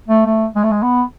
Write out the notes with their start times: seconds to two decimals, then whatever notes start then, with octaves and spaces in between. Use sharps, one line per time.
0.08 A3
0.26 A3
0.55 G#3
0.63 A3
0.71 G#3
0.83 B3